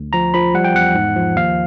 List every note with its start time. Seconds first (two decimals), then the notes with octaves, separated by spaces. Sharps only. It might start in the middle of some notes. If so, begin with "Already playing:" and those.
Already playing: D2
0.13 F3 A#5
0.34 F3 B5
0.54 G3 F#5
0.64 G5
0.74 E2 F#5
0.95 G#2
1.16 F3
1.36 D#2 F5